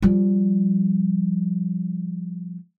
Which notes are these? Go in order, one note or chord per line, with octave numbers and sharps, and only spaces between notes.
F3 G3